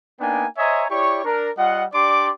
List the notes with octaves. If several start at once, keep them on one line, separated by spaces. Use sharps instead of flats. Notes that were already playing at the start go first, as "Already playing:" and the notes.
A#3 B3 D4 D#4 G5 G#5
C5 C#5 D#5 E5 G#5 A#5
E4 G4 C#5 D5 C#6
D4 A#4
G3 F4 D#5 F#5
D4 G4 D5 C6 D6